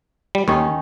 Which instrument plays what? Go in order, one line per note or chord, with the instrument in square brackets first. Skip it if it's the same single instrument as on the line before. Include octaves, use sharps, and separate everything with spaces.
[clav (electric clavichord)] G3
[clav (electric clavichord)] D#2 [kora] D#3 C#4 D#4